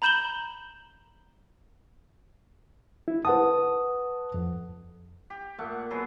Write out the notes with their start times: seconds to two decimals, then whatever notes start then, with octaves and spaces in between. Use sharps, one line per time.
0.02 A#5 B5 G6 E7 F#7 G7
3.08 E4
3.25 B4 F#5 A5 D#6
4.34 F2
5.30 G4
5.58 A#2 A3 F#5
5.91 F#3 B3 G#4